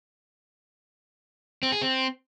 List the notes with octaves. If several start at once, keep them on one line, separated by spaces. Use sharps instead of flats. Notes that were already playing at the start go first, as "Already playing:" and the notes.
C4
G#4
C4